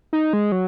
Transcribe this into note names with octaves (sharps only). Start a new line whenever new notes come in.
D#4
G#3
F#3